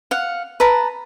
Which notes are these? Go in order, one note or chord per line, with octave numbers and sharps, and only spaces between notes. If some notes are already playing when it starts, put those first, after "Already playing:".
F5 F#5
B4 A5 A#5